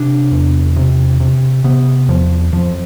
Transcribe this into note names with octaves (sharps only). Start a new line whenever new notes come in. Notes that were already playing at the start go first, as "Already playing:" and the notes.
Already playing: C3 D4
E2
C3
C3
C3 B3
E2 F3
F2 F3